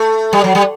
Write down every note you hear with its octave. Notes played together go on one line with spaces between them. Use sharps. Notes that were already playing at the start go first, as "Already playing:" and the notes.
Already playing: A3
G3
F#3
G3